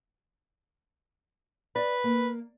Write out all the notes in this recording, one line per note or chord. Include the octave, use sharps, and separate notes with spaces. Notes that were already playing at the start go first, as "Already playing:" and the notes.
B4 D5
A#3